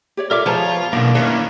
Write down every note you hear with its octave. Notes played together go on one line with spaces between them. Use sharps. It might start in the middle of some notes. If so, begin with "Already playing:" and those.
G4 C#5 D5
F4 A4 A#4 D5 E5 D6
F3 B3 F4 G#4 C5 C#5 A5 A#5
B1 E2 B2 D#3 A#3 D4
D#2 D#3 C#4 E4 B4 C#5